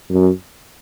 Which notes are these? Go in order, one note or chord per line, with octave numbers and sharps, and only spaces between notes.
F#2